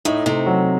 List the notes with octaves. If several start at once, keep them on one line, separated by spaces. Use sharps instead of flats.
A2 A3 D#4
C3 A3 C4
F#3